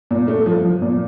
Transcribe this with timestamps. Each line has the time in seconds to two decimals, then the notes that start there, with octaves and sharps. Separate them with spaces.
0.11 A#2
0.28 A3
0.46 F3
0.65 F3
0.82 A#2